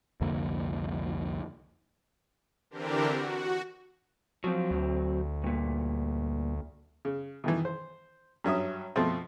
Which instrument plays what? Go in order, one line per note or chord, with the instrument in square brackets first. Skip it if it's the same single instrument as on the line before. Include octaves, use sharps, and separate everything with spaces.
[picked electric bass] C2 F2 D3 A#3
[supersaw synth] D3 E3 C4 D4 G4 A#4
F#4
[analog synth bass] F3 [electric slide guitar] F#3 C4
[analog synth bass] D2
[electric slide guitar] G2 A#2
[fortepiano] C#3
B2 D#3 E3
C5
G2 F#3 C#4 E5 D#6
B2 F3 A3 C4